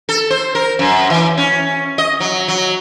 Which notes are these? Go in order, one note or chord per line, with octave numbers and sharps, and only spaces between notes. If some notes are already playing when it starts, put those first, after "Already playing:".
A4
C5
A#4
F#2
E3
C#4
D#5
F#3
F#3